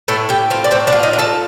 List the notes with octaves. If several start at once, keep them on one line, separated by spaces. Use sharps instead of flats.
A2 A3 A4
A2 G4
C4 F4
D5
A2 C4 C5
D4 D5
F4
D#4 D#5
D4
A4 A5